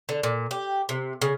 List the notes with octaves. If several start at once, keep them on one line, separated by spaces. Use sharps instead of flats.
D3
A#2
G4
C3
C#3